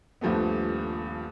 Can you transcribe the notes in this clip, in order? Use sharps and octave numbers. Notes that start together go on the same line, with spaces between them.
D#1 G2 F3 A3 B3